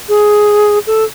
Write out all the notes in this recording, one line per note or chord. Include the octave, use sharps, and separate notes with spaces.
G#4
A4